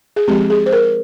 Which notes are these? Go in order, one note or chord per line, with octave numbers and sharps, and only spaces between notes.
G#4
F3 G#3 C4 G4
G#4
C5
A#4